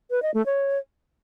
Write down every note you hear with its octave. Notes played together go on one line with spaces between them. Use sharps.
B4
D#5
A3
C#5